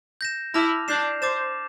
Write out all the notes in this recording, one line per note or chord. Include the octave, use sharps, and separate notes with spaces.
G6 A#6 E7
E4 A5 D6 F6 A#6 F7
D4 G6 C7 E7
C5 D6 A6 E7